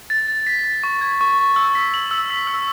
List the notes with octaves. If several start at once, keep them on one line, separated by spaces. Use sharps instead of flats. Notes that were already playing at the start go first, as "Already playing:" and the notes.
A6
A6
B6
B6
C#6
G#6
C#6
C#6
E6
B6
F#7
E6
B6
E6